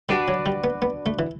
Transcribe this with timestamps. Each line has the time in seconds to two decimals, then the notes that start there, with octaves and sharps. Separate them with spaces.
0.09 G3 D4 F#4 B4 D5
0.28 F#3
0.46 G3
0.64 B3
0.82 B3
1.06 A3
1.19 E3